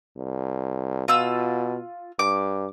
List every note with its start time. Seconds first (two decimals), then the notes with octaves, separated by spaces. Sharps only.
0.17 C2
1.08 B2 F4 E6
2.19 G2 D6